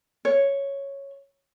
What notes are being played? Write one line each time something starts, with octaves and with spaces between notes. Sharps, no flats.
C#5